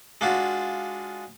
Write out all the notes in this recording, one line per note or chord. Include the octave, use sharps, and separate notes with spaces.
G#3 D4 F4 F#4